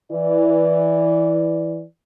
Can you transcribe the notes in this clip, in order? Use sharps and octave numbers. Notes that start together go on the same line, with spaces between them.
E3 D5